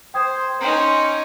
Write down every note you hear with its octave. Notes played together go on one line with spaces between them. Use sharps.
C5 G5 D#6 G#6
C#4 D#4 G5 A#5 C6